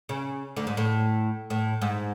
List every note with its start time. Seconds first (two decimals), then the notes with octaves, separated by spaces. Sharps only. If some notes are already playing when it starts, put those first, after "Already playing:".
0.09 C#3
0.57 D2 D3
0.67 G#2
0.77 A2
1.50 A2
1.82 G#2